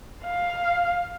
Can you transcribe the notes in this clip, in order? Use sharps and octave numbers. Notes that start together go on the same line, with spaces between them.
F5